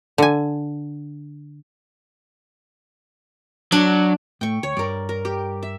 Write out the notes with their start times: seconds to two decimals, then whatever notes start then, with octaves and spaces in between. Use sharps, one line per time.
0.18 D3 G#5
3.72 F#3 D4
4.41 A2 A3 G5 C#6
4.63 D2 C#5
4.77 G2 G3 A#4 D5
5.09 A#4
5.25 G4
5.63 E5